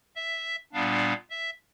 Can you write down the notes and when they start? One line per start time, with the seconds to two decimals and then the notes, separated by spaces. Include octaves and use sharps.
0.16 E5
0.73 A#2 G3 B3 D4 F5
1.30 E5